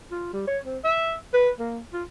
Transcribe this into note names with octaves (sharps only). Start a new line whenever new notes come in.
F4
G3
C#5
C4
E5
B4
A#3
F4